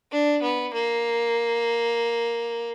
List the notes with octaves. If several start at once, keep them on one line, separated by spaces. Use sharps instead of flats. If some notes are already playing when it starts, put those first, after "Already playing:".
D4
B3
A#3